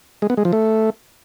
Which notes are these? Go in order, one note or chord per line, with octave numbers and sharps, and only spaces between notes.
G#3
B3
G#3
F3
A3